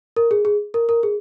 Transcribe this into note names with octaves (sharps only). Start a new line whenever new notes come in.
A#4
G#4
G#4
A#4
A#4
G#4